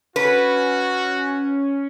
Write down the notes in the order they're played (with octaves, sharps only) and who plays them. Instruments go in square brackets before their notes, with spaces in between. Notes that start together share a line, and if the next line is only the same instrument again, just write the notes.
[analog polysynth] C#4 [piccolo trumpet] F#4 [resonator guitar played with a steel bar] B4